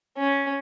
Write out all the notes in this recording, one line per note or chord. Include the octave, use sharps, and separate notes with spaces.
C#4